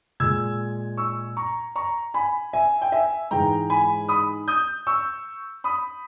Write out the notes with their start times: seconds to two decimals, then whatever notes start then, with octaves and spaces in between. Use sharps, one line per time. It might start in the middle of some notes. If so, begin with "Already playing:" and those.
0.20 A#2 G#3 E6 G#6
0.97 C#6 E6
1.37 A#5 C#6
1.76 A#5 C#6
2.14 G#5 B5
2.53 E5 G#5
2.82 G5
2.92 E5 G#5
3.31 G#2 E3 G#3 G5 A#5
3.70 G#5 B5
4.09 B5 D#6
4.48 D#6 G6
4.87 C#6 E6
5.64 B5 D#6